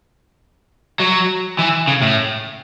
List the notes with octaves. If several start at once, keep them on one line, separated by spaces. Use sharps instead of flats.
F#3
E3
C#3
A2